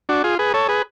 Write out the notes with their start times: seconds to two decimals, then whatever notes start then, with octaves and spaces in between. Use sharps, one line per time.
0.09 D4 F#4
0.24 F4 G#4
0.39 G#4 B4
0.54 A4 C#5
0.68 G#4 B4